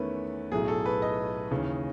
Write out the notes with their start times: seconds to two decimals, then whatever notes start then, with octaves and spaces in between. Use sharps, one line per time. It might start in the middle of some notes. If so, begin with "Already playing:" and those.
Already playing: E2 D#3 A3 C#4 B4
0.52 B1 A2 F#3 A3 G#4
0.68 A4
0.86 B4
1.02 D#5
1.51 D#2 C#3 E3